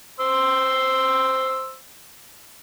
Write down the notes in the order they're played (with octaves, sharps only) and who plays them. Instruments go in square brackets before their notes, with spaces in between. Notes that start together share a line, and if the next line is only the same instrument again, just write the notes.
[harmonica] C5 C6 E6